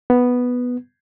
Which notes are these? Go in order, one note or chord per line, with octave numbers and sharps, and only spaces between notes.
B3